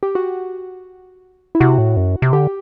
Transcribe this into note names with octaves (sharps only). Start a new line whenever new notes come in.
G4
F#4
E4
C3 F#4
A2
F#2
C3
D3 G4